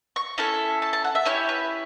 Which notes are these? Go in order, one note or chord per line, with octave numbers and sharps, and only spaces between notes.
C#6
C#4 E4 A4 A5
A5
A5
F#5
E5
C#4 E4 G4 C#5
B4